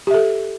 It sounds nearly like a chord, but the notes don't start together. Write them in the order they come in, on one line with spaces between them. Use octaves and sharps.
G4 E5 A4